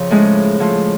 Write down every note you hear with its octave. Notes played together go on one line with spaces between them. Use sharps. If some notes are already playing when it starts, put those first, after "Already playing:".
Already playing: F2 C#3 F3
A2 G#3 C#4
A2 F3 A3 F4